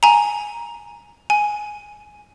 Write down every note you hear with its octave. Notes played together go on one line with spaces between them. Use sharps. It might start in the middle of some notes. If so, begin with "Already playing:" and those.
G#5 A#5
G#5